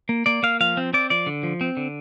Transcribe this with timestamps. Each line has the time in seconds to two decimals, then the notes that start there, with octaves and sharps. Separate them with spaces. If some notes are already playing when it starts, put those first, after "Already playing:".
0.09 A#3
0.26 A#3 D5
0.43 A#3 F5
0.61 F3 F5
0.77 C4
0.93 C4 D5
1.10 F3 D5
1.27 D3
1.43 F3
1.61 C4
1.77 D3